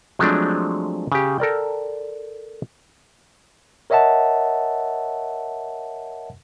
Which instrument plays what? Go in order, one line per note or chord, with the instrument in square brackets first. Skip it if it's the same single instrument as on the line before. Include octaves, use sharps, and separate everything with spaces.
[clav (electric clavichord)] F3 F#3 G#3 A3 C4 D4
C#3 G4
A4 A#4 D5 G5
[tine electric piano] A#4 C#5 D#5 E5 F#5 A5